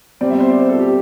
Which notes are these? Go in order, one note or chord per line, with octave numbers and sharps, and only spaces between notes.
B2 G3 C4 D5
E5
C5
D5
C5
A4
G4